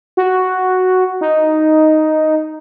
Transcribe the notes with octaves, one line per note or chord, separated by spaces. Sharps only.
F#4
D#4